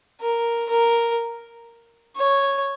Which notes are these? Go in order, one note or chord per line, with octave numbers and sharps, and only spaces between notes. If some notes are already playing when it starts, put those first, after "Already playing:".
A#4
A#4
C#5